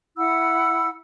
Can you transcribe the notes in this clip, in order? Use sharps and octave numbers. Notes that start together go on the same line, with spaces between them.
E4 F#5 B5 E6